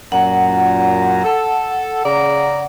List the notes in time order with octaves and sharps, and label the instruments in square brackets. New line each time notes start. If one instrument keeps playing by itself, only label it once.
[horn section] F#2 A#2 A#5 [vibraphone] F#5
[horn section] A4
C#3 D5 A#5